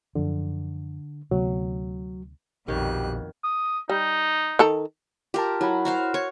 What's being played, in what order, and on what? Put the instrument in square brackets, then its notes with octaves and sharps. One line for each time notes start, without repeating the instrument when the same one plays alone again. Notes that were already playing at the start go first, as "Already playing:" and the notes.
[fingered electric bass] F#2 F3 [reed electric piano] D3
[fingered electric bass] D2 C3 B3 [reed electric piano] F#3
[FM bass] A#1 [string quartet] F2 B2 F#6 [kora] D#3 C#5 [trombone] G4
[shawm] D#6
[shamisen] G3 [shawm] D#4
[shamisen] D#3 A4 A#5
[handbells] F4 A5 [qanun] G4 A#4
[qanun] F#3 [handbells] E4 F#5 B5
[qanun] F#4 C5 F5
C#5 C#6